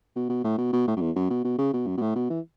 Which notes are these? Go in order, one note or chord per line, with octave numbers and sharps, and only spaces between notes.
B2
B2
A2
B2
B2
A2
F#2
E2
F#2
B2
B2
C#3
B2
F#2
B2
A2
B2
E3